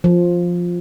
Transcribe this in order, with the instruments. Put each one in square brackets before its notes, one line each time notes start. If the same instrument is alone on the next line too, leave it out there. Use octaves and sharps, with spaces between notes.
[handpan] F3